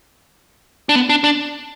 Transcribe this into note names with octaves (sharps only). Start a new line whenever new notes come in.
D4
B3
D4
D4